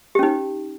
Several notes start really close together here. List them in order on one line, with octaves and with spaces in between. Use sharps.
G4 C#4 D#4